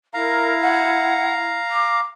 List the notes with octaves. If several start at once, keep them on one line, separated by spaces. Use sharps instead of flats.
E4 A#4 F5 A#5
F#5
D6